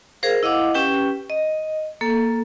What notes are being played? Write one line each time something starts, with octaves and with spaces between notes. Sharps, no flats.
G#4 A#4 C5 F5
E4 D#5 F5 F#5 D6 E6
C#4 G4 B4 G5
D#5
A#3 A4